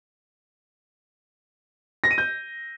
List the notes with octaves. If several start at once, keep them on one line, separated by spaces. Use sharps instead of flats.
A#6
D#7
G6